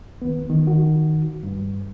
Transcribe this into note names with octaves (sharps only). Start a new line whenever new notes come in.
D#2 B3
D#3
D#3 F#4
G2